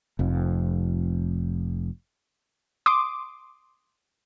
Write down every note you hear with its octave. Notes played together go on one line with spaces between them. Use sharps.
F1 F2
C6 D6 D#6